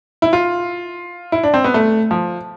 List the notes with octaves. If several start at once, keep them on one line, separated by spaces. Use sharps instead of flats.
E4
F4
E4
D4
C4
B3
A3
F3